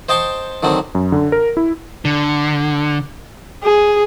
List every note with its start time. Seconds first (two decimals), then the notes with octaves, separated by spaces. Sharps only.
0.09 C5 D#5 G5 A5 C6 C#6
0.63 D3 D#3 F#3 C4
0.95 F#2
1.12 D3
1.32 A#4
1.57 E4
2.05 D3
3.63 G#4